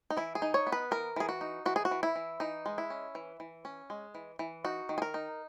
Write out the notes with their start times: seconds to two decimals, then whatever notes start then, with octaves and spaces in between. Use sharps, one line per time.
0.10 D#4
0.17 E3 E4
0.35 G#4
0.42 D#4
0.54 C#5
0.67 B3
0.72 B4
0.91 E3 A#4
1.16 E3 G#4
1.29 F#4
1.41 D#4
1.66 E3 F#4
1.76 G#4
1.85 F#4
1.91 E3
2.03 E4
2.16 E3
2.40 E3 D#4
2.66 G#3
2.78 E4
2.90 C#4
3.15 E3
3.40 E3
3.65 C#4
3.90 G#3
4.15 E3
4.39 E3
4.64 D#4 F#4
4.89 D#3
4.98 G#4
5.02 A#4
5.14 D#4